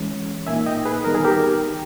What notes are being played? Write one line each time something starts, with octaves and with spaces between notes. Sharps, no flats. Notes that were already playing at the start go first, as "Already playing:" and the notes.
Already playing: E3 G#3 C#4
A#2 A#3 D#4 E5 G#5
D#5 G5
G#4 B4
D#3 G3 B3 D#4 A#4
G#4
G4 A#4